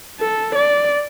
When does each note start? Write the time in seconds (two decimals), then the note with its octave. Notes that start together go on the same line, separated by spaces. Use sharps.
0.20 A4
0.55 D5